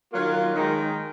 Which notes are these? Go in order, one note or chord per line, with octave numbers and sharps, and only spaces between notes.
D#3 F#3 A#3 F4
D#3 G#3 D#4